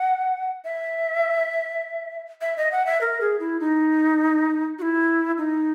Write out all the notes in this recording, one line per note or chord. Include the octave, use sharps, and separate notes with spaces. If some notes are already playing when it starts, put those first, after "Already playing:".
Already playing: F#5
E5
E5
D#5
F#5
E5
A#4
G#4
E4
D#4
F#4
E4
D#4